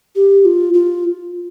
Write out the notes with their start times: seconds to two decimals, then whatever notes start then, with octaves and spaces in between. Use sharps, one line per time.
0.16 G4
0.45 F4
0.74 F4